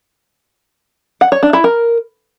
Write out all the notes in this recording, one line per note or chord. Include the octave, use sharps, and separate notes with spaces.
F#5
C#5
D4
E4
A#4